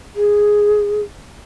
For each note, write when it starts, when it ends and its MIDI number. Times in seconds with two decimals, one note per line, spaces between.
0.15 1.01 68